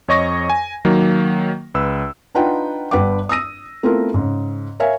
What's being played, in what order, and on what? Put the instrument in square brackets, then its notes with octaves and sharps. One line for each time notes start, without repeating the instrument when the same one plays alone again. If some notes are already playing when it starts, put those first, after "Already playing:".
[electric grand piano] F2 C#5 D#5 C#6 A#6
G#5
D#3 F#3 A#3
C#2 B4 E6
[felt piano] D4 D#4 F4 B4 F#5 G5
G1 G2 B4 F#5 G5 D6
D#6 E6 A#6 D#7
A3 B3 C4 E4 F4 A#4
G#2 C#3
A#4 C#5 E5 F5 G#5